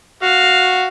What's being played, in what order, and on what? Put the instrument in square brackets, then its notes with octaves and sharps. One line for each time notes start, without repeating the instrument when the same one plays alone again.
[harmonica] F#4 [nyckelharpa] F5